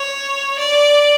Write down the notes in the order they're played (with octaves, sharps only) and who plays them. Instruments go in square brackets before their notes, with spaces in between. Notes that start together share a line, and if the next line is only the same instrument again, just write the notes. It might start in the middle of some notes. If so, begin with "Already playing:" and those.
Already playing: [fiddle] C#5
D5